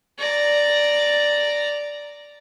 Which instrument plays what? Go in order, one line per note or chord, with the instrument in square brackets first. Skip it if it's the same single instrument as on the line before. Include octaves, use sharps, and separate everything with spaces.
[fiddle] D5 A#5